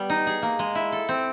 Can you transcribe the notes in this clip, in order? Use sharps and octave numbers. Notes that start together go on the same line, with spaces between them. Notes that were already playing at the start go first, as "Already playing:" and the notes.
Already playing: G3 B3
D#4
G#4
A#3
G#3
E4
A4
C4